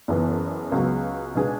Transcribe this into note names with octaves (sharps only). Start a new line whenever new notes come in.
F#1 F#2 E3 B3
C#2 C#3 F#3 B3
B2 G#3 B3 D4 G#4